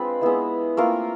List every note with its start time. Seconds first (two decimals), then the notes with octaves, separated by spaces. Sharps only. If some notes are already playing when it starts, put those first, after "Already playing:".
Already playing: G#3 C4 D4 F4 B4
0.21 G#3 B3 E4
0.77 A3 A#3 C4 F4 A#4